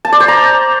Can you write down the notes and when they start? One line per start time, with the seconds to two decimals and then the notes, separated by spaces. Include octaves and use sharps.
0.05 A5
0.12 D5
0.20 C5
0.28 A#5